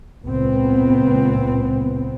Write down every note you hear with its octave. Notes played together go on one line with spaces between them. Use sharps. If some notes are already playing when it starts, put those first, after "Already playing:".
C#2 A#2 B3 C4